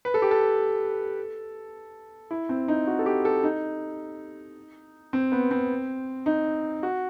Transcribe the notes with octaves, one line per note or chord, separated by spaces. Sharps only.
B4
A4
G4
A4
E4
C4
D#4
F#4
A4
G4
A4
D#4
C4
B3
C4
D#4
F#4